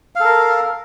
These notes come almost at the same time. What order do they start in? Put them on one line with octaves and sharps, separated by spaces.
F5 A4 A#4